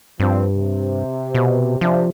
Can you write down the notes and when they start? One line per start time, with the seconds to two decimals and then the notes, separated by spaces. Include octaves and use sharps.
0.20 G2 F3 C4
0.56 C3
1.35 B2
1.81 C3 F3 D4